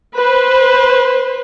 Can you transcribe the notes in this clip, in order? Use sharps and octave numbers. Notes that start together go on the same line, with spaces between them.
B4 C5